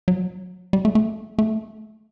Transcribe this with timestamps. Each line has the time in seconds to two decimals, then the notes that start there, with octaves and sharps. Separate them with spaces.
0.08 F#3
0.73 G3
0.85 A3
0.95 A3
1.39 A3